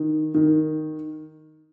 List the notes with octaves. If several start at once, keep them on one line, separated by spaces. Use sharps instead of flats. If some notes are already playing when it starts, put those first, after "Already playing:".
Already playing: D#3
D#3